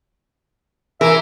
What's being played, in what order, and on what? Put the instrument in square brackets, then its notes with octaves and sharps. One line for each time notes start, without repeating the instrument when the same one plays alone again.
[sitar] E3 [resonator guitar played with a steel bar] A#4 [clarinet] E5